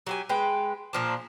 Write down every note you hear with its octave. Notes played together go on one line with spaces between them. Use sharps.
F#3 G4 G#5
G#3 B4 G5
A#2 F3 D4